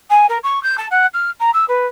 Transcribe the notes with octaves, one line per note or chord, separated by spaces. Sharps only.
G#5
A#4
C#6
G6
A5
F#5
F6
A#5
E6
B4